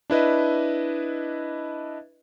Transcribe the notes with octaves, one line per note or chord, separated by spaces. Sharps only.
D4 E4 B4 D#5